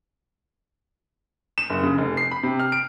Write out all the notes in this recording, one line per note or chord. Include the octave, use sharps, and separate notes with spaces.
E7
F#1
C#3
F1
C7
B5
C3
F6
D7